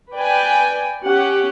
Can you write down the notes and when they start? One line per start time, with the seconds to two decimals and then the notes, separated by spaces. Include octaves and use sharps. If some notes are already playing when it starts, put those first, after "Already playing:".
0.14 B4 D5 G5 G#5
1.05 C#4 G4 F#5